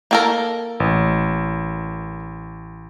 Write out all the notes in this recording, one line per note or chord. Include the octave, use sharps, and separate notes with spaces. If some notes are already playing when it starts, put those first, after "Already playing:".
A#3 A4 A#4
A1